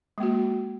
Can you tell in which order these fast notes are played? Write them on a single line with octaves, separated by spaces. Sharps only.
G#3 A#3 F#4